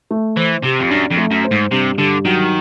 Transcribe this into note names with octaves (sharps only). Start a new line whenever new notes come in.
A3
E3 C5
C3 G4
F2
F#2 D4
F2
A3
F#2
C5
G#2
G2 C3
G2 D3
D#3 F#3